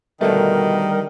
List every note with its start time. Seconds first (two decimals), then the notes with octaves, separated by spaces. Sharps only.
0.21 B2 D3 D#3 G3 A3 A#4